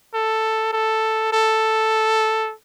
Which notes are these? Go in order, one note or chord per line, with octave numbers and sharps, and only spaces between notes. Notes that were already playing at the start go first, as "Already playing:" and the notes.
A4
A4
A4